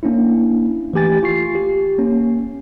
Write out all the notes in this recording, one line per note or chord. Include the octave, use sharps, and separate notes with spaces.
A#3 C#4 D4 E4
E3 A3 G4 G#5 A6
F4 C#6 C7
G4
A#3 C#4